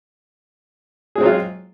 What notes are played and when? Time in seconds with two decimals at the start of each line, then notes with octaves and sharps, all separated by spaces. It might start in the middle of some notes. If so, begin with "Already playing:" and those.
1.15 G#4
1.18 G#3
1.20 C4
1.23 F#3
1.26 F4